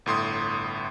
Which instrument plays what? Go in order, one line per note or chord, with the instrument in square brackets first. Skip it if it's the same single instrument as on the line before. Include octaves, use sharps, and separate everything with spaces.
[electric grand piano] G1 A2 C6 D#6